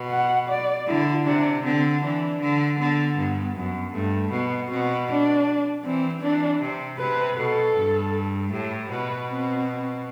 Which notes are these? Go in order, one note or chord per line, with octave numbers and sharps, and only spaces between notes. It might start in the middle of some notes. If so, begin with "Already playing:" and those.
Already playing: B2
F#5
D5
D3 E4
C3 D4
D3 C4
E3 D4
D3
D3 B3
G2 B3
F#2 B3
G2 A3
B2 B3
B2 C4
D4
E3 C4
E3 D4
C3
C3 B4
B2 A4
G2
A2 G4
B2 B4
C4